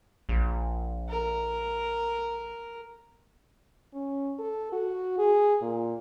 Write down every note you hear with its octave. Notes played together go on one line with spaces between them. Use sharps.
A#1
A#4
C#4
A4
F#4
G#4
A#2